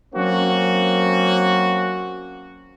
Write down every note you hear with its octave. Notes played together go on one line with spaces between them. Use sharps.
F#3 A#3 C4 C#4 F#4